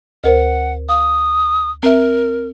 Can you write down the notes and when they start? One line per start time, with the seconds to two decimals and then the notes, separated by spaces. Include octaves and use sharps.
0.24 D2 A#4 C5 F#5
0.89 F5 D#6
1.83 C4 A#4 E5